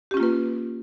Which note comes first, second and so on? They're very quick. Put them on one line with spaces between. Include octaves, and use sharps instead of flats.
G4 C#4 F4 A#3 B4